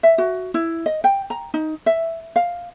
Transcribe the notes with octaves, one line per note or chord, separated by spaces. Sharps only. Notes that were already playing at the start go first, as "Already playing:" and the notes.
E5
F#4
E4
D#5
G5
A#5
D#4
E5
F5